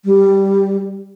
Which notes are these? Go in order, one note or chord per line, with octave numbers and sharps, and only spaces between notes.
G3